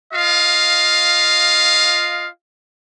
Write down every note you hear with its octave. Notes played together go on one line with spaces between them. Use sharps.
F4 D#5 F5